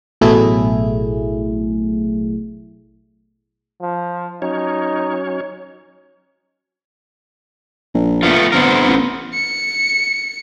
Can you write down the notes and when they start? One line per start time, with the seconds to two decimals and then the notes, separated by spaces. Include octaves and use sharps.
0.21 A1 B2 F#3 A3 E4 G#4
3.81 F3
4.42 F#3 C#4 D#4 C#5
7.94 A#1
8.23 A3 B3 F4
8.52 G1 B3 C4 A#4
8.87 A1
9.34 C#7